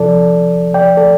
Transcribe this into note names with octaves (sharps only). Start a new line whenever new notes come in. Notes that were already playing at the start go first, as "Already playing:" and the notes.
Already playing: F2 C3 F3 A4 D5
F2 F3 D5 G5
A4 D5